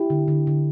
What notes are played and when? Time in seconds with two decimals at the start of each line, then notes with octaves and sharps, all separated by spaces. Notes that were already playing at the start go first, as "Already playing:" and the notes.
Already playing: E4 G4
0.10 D3
0.28 D3
0.47 D3